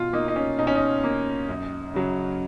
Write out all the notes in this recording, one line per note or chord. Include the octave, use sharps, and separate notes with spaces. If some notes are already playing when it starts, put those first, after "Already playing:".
Already playing: B2 F4
A#3 D#4
D#4
C#4
B2 D#4
C#4
D#4
A#3
F#2
C#3 F#3